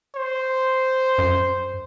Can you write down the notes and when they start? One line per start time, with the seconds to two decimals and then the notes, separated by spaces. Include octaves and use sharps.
0.16 C5
1.18 F#2